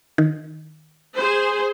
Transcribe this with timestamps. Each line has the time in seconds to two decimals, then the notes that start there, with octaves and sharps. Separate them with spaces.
0.18 D#3
1.16 G#4 C5